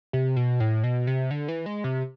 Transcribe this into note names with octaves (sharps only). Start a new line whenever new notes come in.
C3
B2
A2
B2
C3
D3
E3
G#3
C3